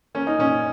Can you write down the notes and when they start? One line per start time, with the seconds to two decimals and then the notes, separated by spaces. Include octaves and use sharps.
0.15 A#3 C#4
0.27 D#4
0.39 A#2 C#4